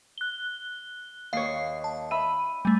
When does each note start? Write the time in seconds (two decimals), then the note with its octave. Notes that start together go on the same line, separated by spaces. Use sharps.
0.18 F#6 G7
1.33 D#2 C#5 F5 C7
1.84 A5
2.11 E5 B5 D#7
2.65 G3 A3 G#5